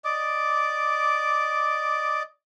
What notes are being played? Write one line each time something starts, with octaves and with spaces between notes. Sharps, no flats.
D5 D#5 D6